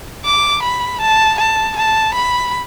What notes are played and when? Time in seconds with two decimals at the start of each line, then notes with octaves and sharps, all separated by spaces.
0.25 D6
0.63 B5
1.01 A5
1.39 A5
1.77 A5
2.15 B5